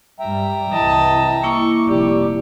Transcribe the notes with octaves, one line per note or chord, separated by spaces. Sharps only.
G2 G3 E5 G5 A#5
C2 E3 D#5 A5
A#3 E4 C#6 D6
F1 G3 G4